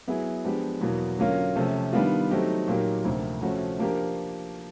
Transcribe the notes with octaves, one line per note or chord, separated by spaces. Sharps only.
F#3 B3 E4 G#4
F3 G#3 B3 D4 G4
E2 B2 F#3 A#3
D3 F#3 A#3 C#4 F4
C3 F3 A3 C#4
D#3 G3 B3 D4 F4
F#3 A3 C4 D#4 G4
A#2 F#3 A#3 D#4 G4
D2 C3 F3 A#3
C3 F3 A3 C#4 F#4
F3 A#3 D4 G4 A#4